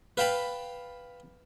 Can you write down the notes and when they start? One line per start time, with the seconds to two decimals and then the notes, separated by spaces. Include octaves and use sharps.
0.17 B4 F5 G5 A5 B5